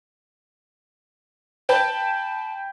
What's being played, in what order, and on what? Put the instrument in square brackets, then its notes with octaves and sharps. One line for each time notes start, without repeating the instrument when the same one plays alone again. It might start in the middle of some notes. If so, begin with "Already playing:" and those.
[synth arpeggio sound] B4 [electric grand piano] G5 B5 G6 [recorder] A5